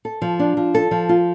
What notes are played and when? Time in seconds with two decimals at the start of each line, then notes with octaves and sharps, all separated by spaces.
0.05 A4
0.22 F3
0.39 D4
0.57 F3
0.75 A4
0.91 F3
1.09 F4